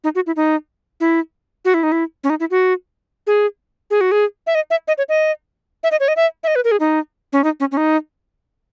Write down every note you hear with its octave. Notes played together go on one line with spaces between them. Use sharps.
D#4
F#4
E4
D#4
E4
F#4
E4
D#4
E4
C#4
D#4
E4
F#4
G#4
G#4
F#4
G#4
E5
D#5
E5
D#5
C#5
D#5
E5
D#5
C#5
D#5
E5
E5
D#5
B4
A#4
G#4
D#4
C#4
D#4
C#4
C#4
D#4